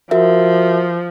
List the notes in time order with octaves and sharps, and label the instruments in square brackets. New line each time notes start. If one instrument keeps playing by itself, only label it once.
[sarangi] F3 [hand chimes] F#4 A#4 E5